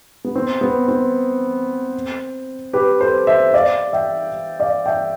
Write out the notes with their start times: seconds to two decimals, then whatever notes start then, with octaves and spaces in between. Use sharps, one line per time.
0.24 B3
0.36 C4
0.61 B3
0.88 C4
2.73 G4 B4
3.01 A4 C5
3.27 C5 E5
3.53 D5 F5
3.93 E5 G5
4.60 D5 F5
4.86 E5 G5